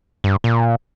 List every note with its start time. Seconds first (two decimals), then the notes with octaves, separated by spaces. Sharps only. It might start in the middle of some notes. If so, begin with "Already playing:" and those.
0.24 G2
0.44 A#2